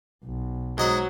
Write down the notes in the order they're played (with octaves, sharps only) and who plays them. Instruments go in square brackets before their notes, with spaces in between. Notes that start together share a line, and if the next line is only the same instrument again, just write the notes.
[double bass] B1
[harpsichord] G#2 D#5 F#5 [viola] F#3